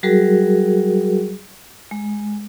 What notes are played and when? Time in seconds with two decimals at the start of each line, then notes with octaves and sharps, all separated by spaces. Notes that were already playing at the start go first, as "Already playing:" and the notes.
0.03 F#3 G3 F#4 G#4 A#4
1.91 G#3